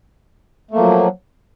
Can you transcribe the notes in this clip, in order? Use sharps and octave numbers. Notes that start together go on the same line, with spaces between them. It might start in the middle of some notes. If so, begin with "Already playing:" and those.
F3 F#3 A3 A#3